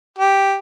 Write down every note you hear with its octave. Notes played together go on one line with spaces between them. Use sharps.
G4